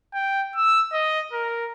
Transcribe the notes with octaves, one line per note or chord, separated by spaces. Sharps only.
G5
E6
D#5
A#4